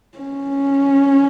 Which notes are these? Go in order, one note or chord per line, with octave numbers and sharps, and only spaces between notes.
C#4